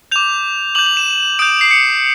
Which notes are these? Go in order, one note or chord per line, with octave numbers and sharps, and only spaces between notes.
D6 G6 F7
D6 G6 F#7
F#7
E7
D#6 G6 D7
C7
C#7